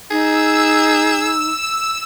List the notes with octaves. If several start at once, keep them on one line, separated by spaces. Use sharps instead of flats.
D#4 G#4 E6